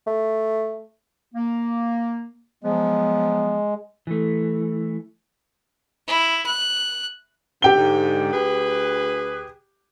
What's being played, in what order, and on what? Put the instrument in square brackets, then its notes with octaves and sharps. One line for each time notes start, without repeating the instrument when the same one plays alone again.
[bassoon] A3
[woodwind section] A#3
[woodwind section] F3 F#3 B3 [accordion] G#3
[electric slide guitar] E3 A3
[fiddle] E4
F#6
[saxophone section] B2 F3 C4 [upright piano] G4 G5 G7
[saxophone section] G#2 D3
D2 G#4 B4